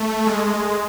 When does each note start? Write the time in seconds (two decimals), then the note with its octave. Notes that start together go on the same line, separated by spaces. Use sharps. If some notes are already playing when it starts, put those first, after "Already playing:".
Already playing: A3
0.27 G#3